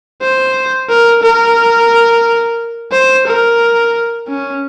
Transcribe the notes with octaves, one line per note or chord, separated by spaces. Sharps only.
C5
A#4
A#4
C5
A#4
C#4